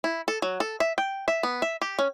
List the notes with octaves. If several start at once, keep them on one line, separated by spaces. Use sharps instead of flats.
E4
A4
F#3
A4
E5
G5
E5
B3
E5
G4
C#4